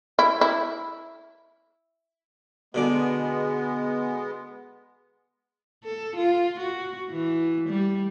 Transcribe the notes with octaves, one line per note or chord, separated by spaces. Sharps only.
E4
E4
B2 D3 G#3 B3 D6
A4
F4
F#4
E3
G3